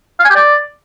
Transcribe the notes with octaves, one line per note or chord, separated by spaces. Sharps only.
F5
G#5
G4
D5